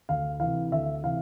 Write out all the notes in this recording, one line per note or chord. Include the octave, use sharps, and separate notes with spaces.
D2 F5
C3 E3 F5
D2 E5
C3 E3 F5